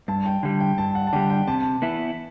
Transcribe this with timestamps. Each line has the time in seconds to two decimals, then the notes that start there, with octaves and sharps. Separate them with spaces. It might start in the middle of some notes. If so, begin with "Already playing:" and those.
0.08 G2 A5
0.26 G5
0.43 D3 G3 A5
0.60 G5
0.78 G2 A5
0.95 F#5
1.07 A5
1.13 D3 G3 G5
1.30 G5
1.47 C3 A5
1.82 E3 B3 E4